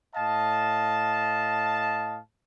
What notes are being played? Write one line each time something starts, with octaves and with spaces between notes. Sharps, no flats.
A2 D#5 F5 A5